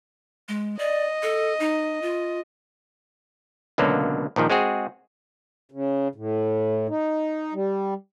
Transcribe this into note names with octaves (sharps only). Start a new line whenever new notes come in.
G#3
D5 D#5
A4
D#4
F4
C#2 B2 D3 F#3 A#3
A#1 A#2 D#3 F3
G#3 C4 F#4 G#4
C#3
A2
D#4
G3